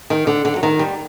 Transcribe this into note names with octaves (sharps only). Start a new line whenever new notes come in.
D#3
D3
D3
F#3
D#3
G3